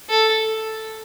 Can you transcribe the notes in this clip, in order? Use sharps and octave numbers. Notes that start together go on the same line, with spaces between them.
A4